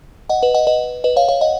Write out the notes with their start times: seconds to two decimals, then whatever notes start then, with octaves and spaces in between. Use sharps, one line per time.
0.29 D#5 F#5
0.42 B4 D#5
0.54 D#5 F#5
0.67 B4 D#5
1.04 B4 D#5
1.16 C#5 F5
1.28 C#5 F5
1.41 D#5 F#5